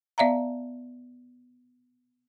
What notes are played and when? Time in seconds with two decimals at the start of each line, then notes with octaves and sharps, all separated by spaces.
0.18 B3 D5 E5 F5 A#5